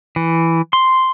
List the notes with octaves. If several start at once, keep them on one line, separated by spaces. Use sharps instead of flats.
E3
C6